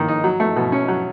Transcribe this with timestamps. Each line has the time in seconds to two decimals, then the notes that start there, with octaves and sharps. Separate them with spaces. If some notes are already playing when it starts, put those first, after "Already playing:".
Already playing: D#3 A#3
0.08 D#4
0.24 F#3
0.40 A3
0.56 B2
0.72 C#4
0.88 F#3